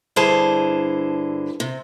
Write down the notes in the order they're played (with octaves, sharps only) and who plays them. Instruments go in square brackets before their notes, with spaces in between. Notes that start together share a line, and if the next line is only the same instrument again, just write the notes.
[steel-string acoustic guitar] G2 D3 E4 G#4 C5 A5
C3